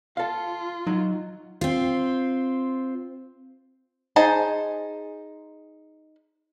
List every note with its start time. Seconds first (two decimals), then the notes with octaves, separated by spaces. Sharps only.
0.17 F4 A4 F5
0.87 F#3 D#4
1.61 C4 F4
4.16 D#4 G#4 C5 A5